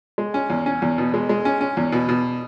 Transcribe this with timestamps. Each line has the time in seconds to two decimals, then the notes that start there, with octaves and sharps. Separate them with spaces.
0.18 G#3
0.34 C#4
0.50 E2
0.66 C#4
0.82 E2
0.98 B2
1.14 G#3
1.29 G#3
1.45 C#4
1.61 C#4
1.77 E2
1.92 B2
2.09 B2